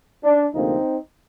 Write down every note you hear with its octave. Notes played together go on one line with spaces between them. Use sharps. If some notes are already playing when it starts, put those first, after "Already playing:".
D4
D2 C3 F3 A#3 C4 D#4